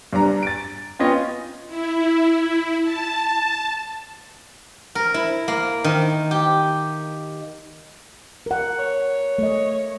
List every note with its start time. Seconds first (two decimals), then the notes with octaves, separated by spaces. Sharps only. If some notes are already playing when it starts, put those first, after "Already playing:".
0.13 G2 D4 A#5
0.43 A6 D7
0.99 B3 C#4 F4 D#5 G5
1.68 E4
2.83 A5
4.95 A#4
5.14 E4
5.48 A#3
5.84 D#3
6.31 G4
8.46 A#4 F#5
8.79 C#5
9.38 A3 D#5